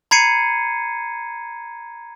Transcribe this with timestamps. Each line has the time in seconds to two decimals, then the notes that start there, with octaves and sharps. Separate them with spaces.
0.11 A#5 B5 G#6 C7 C#7 D#7